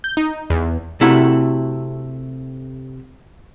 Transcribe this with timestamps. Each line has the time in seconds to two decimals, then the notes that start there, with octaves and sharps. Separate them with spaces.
0.04 G6
0.17 D#4
0.50 E2
1.01 C3 A3 E4 F#4 A4 A#4